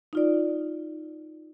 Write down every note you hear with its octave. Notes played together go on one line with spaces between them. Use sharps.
D#4 F4 D5